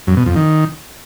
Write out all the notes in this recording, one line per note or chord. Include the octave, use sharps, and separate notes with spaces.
F#2
B2
F2
D#3